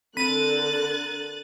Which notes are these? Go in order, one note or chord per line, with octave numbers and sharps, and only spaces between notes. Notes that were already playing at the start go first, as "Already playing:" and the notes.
D3 C4 A#4 F#6 A6 D#7